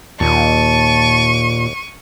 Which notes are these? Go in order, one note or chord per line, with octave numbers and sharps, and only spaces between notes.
D#2 A#2 A5 C#6 D#7